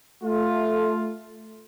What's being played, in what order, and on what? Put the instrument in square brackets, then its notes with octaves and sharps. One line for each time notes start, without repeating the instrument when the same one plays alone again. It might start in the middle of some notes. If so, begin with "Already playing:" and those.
[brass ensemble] A3 F4